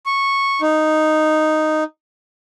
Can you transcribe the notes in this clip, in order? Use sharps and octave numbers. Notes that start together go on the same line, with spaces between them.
C#6
D#4